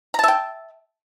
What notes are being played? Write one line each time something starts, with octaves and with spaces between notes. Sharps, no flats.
E5 G5 A5 A#5